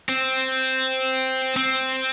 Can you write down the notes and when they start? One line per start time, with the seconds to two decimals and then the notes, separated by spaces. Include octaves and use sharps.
0.09 C4
1.57 C4